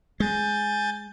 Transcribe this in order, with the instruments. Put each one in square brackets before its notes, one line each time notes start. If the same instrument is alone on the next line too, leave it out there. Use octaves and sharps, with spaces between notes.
[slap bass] G#3 [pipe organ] G#5 G6 A6